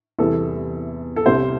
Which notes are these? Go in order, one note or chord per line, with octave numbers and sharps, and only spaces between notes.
E2 C3 E3 G3 A4
A4
C2 C3 G3 C5